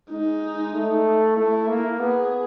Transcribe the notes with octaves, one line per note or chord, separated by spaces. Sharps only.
G#3 D#4
A3
A3 E4
A#3
B3 G#4